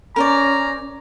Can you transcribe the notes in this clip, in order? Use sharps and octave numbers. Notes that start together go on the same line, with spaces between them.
C#4 A#4 C5 D5 A#5